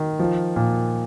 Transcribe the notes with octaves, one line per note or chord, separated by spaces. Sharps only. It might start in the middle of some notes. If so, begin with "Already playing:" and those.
Already playing: D#3
F3
A#2